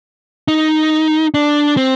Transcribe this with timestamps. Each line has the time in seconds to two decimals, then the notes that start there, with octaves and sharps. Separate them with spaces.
0.48 D#4
1.34 D4
1.77 C4